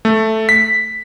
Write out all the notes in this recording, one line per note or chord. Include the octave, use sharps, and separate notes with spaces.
A3
B6